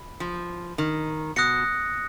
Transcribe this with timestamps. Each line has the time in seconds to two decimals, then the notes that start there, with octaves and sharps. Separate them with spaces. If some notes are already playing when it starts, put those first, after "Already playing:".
Already playing: B5
0.20 F3
0.78 D#3
1.36 B2 D#6 F#6 A#6 C#7